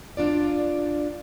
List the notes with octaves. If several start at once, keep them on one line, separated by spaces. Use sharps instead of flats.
D4 F4 D5